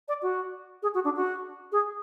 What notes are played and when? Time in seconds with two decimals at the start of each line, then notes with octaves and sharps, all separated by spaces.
0.08 D5
0.23 F#4
0.82 G#4
0.94 F#4
1.05 D4
1.16 F#4
1.72 G#4